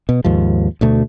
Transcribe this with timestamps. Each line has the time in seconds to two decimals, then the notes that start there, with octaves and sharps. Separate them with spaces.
0.09 B2
0.24 D#2 G#2 F3
0.81 D2 B2 A3